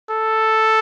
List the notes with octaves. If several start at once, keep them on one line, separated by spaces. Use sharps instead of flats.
A4